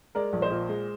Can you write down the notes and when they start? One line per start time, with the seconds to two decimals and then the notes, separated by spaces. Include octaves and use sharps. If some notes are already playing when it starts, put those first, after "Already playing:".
0.15 G#3 A#4 D5
0.33 A#1
0.42 C5 D#5
0.51 A#2
0.69 G#3